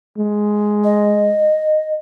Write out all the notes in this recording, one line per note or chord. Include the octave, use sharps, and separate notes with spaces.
G#3
D#5